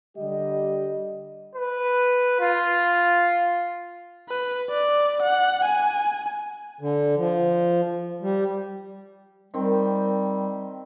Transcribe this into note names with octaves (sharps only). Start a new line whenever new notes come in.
D3 G3 G4 D#5
B4
F4
B4
D5
F#5
G#5
D3
F3
G3
D#3 G3 C4